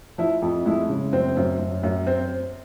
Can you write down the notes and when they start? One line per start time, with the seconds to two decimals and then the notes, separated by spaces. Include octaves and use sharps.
0.18 F3 E4
0.42 F2
0.66 G#3 E4
0.89 C#3
1.13 F#2 C4
1.37 F#2
1.59 F#2
1.83 F#2
2.07 C4